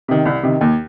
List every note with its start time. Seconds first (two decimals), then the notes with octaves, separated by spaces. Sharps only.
0.08 C3 D#3
0.25 C2
0.43 C3 D#3
0.61 D#2